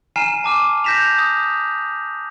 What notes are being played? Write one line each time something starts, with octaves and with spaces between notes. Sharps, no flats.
G#5 A#5 F6 C7 D#7 E7
A5 D6 F6
G6 A#6 B6 E7 F7
D#6